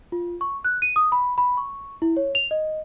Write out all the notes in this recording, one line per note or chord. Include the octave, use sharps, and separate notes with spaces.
F4
C#6
F#6
D#7
D#6
B5
B5
C#6
E4
C#5
F7
D#5